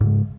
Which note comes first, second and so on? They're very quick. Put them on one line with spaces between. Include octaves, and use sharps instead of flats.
G#2 C#3 G#3